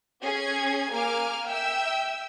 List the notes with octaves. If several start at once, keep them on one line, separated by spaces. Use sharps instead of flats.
C#4 G#4 G#6
A#3 G#5 D6 F6
E5 G5 E6